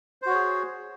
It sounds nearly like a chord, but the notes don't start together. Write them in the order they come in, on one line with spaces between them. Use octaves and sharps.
C5 F#4 C#5 G#4